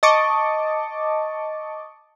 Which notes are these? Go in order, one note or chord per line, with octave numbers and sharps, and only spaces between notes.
D#5 A5 C#6 D6